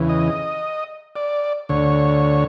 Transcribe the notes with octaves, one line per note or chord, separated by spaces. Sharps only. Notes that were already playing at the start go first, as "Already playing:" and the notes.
Already playing: E2 C#3 E3
D#5
D5
D2 D3 C#5